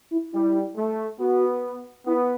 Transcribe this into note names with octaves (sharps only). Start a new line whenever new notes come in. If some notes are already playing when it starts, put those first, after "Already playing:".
E4
G3 E4
A3
B3 F#4
B3 E4